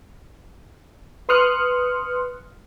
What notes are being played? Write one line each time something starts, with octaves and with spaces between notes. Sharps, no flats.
B4 C6 D#6 F6 F#6 C#7